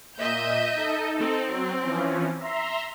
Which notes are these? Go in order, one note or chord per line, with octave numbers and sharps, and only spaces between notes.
A#2 D#5 E5 G6 D#7
D#4 A4
C4
F#3
E3 F3 C#4
E5 A#5 C6